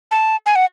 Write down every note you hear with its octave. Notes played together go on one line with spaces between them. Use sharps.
A5
G#5
F#5